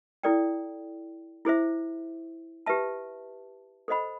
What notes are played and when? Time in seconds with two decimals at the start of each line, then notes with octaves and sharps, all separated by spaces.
0.23 E4 A4 D5 G5
1.45 E4 G#4 C5 E5
2.66 G4 B4 E5 A5
3.88 A4 C5 D#5 F#5 B5